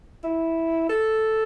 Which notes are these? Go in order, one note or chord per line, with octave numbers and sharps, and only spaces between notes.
E4
A4